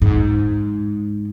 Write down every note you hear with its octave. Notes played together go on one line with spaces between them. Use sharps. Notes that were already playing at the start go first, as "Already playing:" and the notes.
G#2